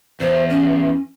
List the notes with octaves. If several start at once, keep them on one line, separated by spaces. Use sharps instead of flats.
E2 C5
C#4